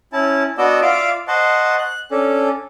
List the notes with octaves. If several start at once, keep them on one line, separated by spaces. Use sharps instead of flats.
C#4 E4 A5
B3 D4 F#4 D5 D#5 E6
F4 D5 E5 F5 D6
C5 D#5 F#5 A5 C#6
F#6
C#4 D4 A4